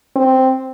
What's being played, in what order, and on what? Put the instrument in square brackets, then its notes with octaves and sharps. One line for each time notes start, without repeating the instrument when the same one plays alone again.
[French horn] C4